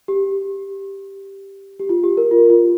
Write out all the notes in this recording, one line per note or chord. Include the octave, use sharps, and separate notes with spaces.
G4
G4
F4
G4
A#4
F4
F4